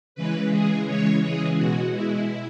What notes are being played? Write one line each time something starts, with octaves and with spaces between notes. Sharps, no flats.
C#3 E3 G#3 B4
G#4
C#3 E3 G#3 C#5
G#4
B2 G#3 F#4
E4